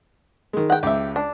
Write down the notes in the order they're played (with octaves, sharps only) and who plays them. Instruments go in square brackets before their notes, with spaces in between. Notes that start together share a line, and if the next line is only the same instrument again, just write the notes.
[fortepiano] D#3 G#3
[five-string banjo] F#5 G5
[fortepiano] C#2 [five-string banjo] G4 E5
[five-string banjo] D4